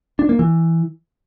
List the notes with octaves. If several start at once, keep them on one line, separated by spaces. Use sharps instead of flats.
D4
A#3
E3